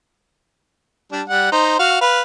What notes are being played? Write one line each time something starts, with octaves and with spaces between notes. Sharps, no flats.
G3 D4
G3 F#5
D#4 C5
F#4 F5
B4 F5